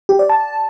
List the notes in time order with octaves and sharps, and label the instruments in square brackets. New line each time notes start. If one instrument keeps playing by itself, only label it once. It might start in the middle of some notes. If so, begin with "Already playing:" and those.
[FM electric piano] G4
D5
A5